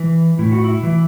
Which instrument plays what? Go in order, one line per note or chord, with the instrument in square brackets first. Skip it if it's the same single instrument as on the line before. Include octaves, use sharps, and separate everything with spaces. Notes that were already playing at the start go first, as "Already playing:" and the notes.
Already playing: [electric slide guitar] E3
A2 E4
F#4
E4
E3